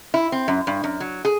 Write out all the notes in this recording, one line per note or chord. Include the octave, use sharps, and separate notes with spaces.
E4
C4
F#2
G2
F#2
F#3
G#4